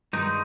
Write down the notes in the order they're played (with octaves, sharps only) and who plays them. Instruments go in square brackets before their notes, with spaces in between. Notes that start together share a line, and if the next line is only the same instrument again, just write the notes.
[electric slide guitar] G2 D#3 G#3 D#4